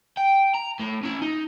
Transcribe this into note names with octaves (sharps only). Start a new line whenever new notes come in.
G5
A#5
A2
C#4 E4
D#4